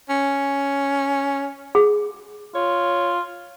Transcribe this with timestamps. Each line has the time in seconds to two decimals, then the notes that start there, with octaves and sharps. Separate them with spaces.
0.09 C#4
1.75 G#4
2.55 F4 C#5